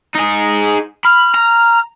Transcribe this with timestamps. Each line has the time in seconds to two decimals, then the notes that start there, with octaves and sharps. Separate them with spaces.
0.15 D#4 G#4
1.05 B5 F6
1.35 A#5